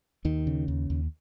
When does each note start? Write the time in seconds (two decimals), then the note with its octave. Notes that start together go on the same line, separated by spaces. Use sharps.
0.25 D#2 D#3
0.47 C#3
0.68 D#2
0.90 D#2